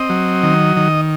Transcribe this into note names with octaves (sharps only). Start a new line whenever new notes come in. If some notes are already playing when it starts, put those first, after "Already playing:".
Already playing: C4 D#5
F#3
D#3
D#3